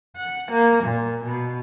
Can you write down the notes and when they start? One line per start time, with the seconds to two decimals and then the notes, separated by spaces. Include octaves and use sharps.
0.16 F#5
0.51 A#3
0.84 A#2
1.24 B2